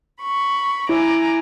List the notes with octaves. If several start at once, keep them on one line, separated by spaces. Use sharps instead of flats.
B5 C#6
E4 G#5 A#5 D6